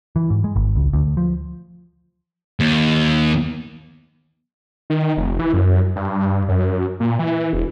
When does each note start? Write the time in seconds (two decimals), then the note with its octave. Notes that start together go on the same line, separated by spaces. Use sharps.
0.16 E3
0.30 G#2
0.44 G#3
0.56 G#1
0.76 C#2
0.93 D2
1.17 F3
2.60 D#2
4.90 D#3
5.17 F1
5.40 E3
5.53 F#2
5.96 G2
6.49 F#2
7.00 A#2
7.19 E3
7.53 E1